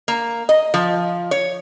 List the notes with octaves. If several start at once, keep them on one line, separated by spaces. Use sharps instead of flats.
A#3
D#5
F3
C#5